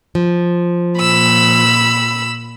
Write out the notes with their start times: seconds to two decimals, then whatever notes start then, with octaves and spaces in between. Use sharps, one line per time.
0.15 F3
0.98 A#2 B5 E6